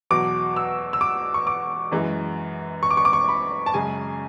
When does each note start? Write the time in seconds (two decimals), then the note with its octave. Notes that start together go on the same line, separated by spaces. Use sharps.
0.11 E2 B2 F#3 D6
0.56 E6
0.93 E6
1.01 D6
1.34 C#6
1.47 D6
1.92 F#2 E3 G#3
2.83 C#6
2.91 D6
2.97 C#6
3.05 D6
3.13 C#6
3.29 B5
3.66 A5
3.74 F#2 C#3 G#3 G#5